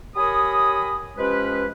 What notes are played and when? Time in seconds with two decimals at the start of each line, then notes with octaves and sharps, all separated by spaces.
0.16 G4 A#4 C#5 G#5 B5 D#6
1.18 F3 G#3 C#4 G4 B4